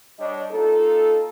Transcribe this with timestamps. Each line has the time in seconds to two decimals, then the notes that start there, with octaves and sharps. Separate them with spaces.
0.19 G3 D4 C#5 D#5
0.51 A#3 D#4 F4 A4